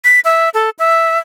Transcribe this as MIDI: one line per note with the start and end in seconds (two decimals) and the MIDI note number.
0.04 0.20 95
0.25 0.49 76
0.54 0.70 69
0.79 1.18 76